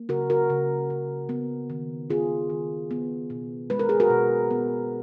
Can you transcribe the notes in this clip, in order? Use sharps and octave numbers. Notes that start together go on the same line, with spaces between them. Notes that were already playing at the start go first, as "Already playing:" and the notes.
Already playing: A#3
C#3 F#4 A#4
F#4 A#4
C#3
C#3
B3
D#3
B3 F4 G#4
D#3
B3
B2
G#3 B4
A#4
G#4
F#4 A#4
B2
B3